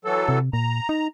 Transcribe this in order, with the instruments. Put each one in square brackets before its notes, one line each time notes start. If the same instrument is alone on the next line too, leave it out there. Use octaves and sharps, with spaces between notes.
[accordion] E3 F#3 A4
[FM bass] C3
[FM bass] A#2 [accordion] A#5
[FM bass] D#4